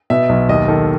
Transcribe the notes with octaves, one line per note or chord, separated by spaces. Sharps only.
B2 E5
B1
D#2 D#5
D#3 A4